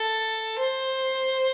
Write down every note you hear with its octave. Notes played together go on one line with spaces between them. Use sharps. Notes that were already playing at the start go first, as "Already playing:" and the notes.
Already playing: A4
C5